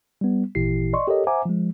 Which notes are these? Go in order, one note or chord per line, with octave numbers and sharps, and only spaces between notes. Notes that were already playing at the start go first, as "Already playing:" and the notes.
G3 B3
G#1 A#2 E3 E4 G4 C7
D5 D#5 C6 C#6
G4 A4 A#4 C#5 D#5
C5 E5 F#5 G#5 A#5 D6
F3 G#3